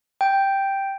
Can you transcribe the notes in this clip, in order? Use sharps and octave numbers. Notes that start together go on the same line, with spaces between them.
G5